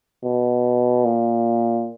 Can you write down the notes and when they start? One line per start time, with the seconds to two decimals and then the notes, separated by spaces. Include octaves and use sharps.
0.24 B2
1.05 A#2